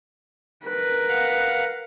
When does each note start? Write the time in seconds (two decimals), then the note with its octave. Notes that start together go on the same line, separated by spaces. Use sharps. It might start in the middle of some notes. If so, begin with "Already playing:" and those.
0.65 A#4 B4
1.08 F5 F#5